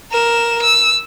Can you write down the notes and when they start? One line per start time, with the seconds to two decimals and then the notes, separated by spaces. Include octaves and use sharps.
0.12 A#4 E7
0.62 E6